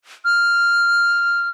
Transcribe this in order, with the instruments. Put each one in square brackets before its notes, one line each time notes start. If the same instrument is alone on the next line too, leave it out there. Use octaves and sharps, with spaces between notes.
[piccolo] F6